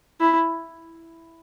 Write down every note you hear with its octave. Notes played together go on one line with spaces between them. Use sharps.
E4